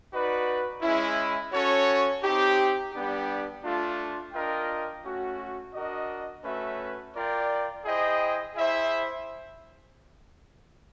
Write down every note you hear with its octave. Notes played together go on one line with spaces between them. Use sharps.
D#4 F#4 B4 D5
G#3 C#4 E4
C#4 F#4 A4 C#5
C4 D#4 G4
G3 B3 D4 G4
A3 D4 F4
D4 F4 A#4 D#5 G5
A3 C#4 F#4
D4 F#4 A#4 D#5
A3 C#4 F#4 B4 E5
F4 A#4 D5 G5
E4 G#4 C5 D#5 G5
E4 G#4 C5 E5